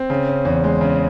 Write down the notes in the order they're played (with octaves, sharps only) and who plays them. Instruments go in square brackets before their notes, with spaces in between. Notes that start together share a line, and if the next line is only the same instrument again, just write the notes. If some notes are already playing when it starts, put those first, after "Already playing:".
Already playing: [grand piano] C4
C#3
C#4
E2
G#3
C#3